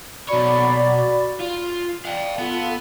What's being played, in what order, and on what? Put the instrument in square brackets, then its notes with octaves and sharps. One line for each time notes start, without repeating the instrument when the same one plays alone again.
[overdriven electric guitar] B2 C#5 [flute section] F#4 D5 B5
[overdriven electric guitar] F4
[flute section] D5 [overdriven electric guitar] F5 G5
[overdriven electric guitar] B3 [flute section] F4 A4